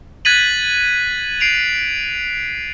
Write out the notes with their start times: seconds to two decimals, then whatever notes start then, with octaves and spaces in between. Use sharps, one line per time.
0.25 F#6 G#6 A6 B6 D#7 F#7
1.40 C7 D7 F7